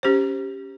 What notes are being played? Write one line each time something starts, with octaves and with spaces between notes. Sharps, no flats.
C#4 G4 C5